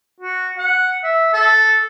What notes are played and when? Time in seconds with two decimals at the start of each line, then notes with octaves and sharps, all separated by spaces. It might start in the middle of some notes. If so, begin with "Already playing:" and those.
0.20 F#4
0.58 F#5
1.04 E5
1.34 A4